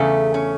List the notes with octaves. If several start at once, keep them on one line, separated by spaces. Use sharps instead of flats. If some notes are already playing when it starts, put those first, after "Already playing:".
Already playing: E2 C#3 A3
C#4